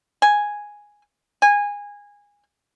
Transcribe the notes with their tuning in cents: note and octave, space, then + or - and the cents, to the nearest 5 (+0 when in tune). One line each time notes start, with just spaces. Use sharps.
G#5 +0
G#5 -20